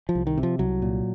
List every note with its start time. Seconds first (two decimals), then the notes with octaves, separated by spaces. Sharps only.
0.09 F3
0.15 C2
0.27 D#3
0.38 C3
0.43 F3
0.59 C2 F#3
0.82 A#2